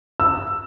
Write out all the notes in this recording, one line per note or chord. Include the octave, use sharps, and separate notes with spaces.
E6